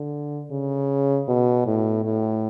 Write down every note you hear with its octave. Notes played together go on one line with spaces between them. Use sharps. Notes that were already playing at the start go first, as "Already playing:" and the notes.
Already playing: D3
C#3
B2
A2
A2